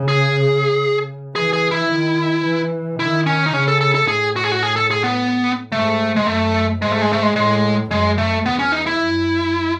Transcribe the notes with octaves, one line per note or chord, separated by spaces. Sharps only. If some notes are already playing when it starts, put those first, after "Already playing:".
Already playing: C#3
G#4
E3 G#4
G#4
E4
D#3
E3
D#3 E4
C#4
D#4
C#3 C#4
A4
A4
A4
A2 G#4
F#4
G#4
F#4
G#4
A4
G#4
B3
G#2 A3
G#3
F#2 A3
G#2 G#3
A3
G#3
A3
G#3
A2 G#3
F#2 G#3
A3
E2 B3
C#4
D#4
E4
F#2